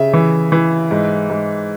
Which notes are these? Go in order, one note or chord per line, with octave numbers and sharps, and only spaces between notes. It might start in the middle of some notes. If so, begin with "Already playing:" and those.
Already playing: C#3 E5
E3
E3
G#2
G#2